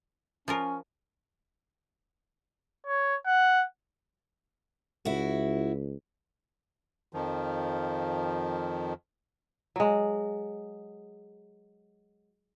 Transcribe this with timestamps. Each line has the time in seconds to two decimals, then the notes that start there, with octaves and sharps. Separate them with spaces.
0.48 F3 C#4 F4 A#4
2.87 C#5
3.26 F#5
5.05 C#2 E4 F#4
7.13 F2 D#3 F3
9.76 F#3 G#3